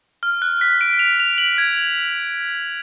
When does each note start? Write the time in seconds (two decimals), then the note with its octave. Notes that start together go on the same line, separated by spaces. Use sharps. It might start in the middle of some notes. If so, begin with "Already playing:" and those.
0.23 F6
0.42 F#6
0.61 B6
0.81 D7
0.99 F7
1.20 F7
1.38 F#7
1.58 G#6